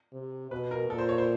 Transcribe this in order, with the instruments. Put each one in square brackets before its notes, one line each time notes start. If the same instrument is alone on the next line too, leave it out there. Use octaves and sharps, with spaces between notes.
[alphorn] C3
[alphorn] B2 [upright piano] B4
[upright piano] A#4
[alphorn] A#2 [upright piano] A4
[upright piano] C5
C#5
C5